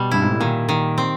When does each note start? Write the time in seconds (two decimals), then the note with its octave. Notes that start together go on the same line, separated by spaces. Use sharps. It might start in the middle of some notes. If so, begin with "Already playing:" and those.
Already playing: B2 G3
0.11 G2 E4
0.22 G#2
0.31 A2
0.40 A#2 D#3
0.69 D#3
0.98 C4